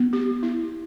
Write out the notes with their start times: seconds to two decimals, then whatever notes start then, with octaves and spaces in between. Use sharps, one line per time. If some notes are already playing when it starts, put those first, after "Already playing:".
Already playing: B3
0.13 G4
0.43 E4